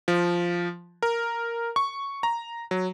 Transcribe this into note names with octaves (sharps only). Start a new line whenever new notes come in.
F3
A#4
C#6
A#5
F#3